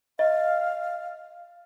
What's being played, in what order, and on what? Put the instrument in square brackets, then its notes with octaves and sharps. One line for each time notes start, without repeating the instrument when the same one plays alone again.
[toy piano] D#5 [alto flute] F5